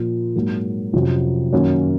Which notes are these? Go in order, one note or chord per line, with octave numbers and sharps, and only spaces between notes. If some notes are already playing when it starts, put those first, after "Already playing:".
Already playing: A#2 F3 A#3 F4
G#2 F#3 A#3
F2 C3 F#3 C#4
F#2 D#3 A#3 C#4 F#4